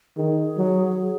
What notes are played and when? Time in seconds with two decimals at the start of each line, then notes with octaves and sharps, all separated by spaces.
0.17 D#3 G#4
0.58 F#3